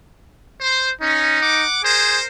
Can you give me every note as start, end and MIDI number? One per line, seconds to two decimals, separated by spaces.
0.60 0.90 72
1.01 1.38 61
1.01 1.64 63
1.41 1.79 78
1.41 1.79 86
1.83 2.17 68
1.83 2.27 70
1.83 2.27 72